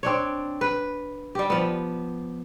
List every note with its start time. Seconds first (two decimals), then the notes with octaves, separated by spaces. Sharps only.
0.03 C4 D4 C#5
0.61 B4
1.35 G3 G4
1.50 F3 B3